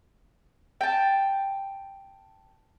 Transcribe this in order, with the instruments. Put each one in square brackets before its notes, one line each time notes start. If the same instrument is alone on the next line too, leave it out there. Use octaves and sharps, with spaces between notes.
[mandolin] G5 A5